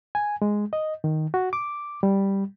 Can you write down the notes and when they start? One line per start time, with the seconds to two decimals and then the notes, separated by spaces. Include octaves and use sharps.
0.15 G#5
0.42 G#3
0.73 D#5
1.04 D#3
1.34 F#4
1.53 D6
2.03 G3